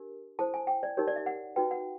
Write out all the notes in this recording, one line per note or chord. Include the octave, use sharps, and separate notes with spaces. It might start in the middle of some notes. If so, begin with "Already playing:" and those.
Already playing: D4 G4 A#4
E4 A4 C5 A5
G#5
G5
D5
D#4 G4 A#4 C#5
D5
E5
F#5
D#4 F#4 B4 G5
F#5